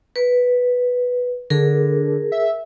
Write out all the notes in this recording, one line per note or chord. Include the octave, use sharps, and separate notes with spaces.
B4
D3 G#4 A#4
E5